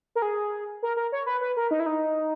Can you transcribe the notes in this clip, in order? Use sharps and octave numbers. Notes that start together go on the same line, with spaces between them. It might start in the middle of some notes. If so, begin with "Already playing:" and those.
A#4
G#4
A#4
A#4
C#5
B4
B4
A#4
D#4
E4
D#4